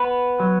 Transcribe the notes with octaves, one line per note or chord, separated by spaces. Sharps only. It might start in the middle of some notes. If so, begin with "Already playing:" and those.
Already playing: B3 B4
F#3